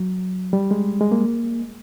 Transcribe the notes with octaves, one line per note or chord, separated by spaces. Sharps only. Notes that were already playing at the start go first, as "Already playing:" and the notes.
Already playing: F#3
G3
G#3
G#3
A#3